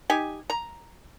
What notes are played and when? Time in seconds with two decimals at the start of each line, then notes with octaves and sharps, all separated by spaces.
0.10 D#4 G4 G#5
0.50 A#5